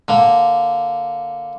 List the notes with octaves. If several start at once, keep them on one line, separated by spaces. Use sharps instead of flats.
D3 A#3